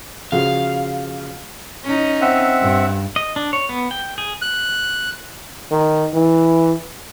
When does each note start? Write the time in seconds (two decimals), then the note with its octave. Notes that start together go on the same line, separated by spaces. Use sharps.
0.32 C#3 F3 F#4 F5
1.83 C#4 D#4
2.21 C4 E5 F#5
2.62 G2
3.16 D#5
3.36 D4
3.53 C#5
3.69 B3
3.91 G5
4.18 G#4
4.42 F#6
5.71 D#3
6.14 E3